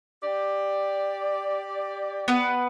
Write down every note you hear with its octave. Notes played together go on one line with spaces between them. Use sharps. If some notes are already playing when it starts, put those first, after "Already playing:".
G4 D5
B3 B4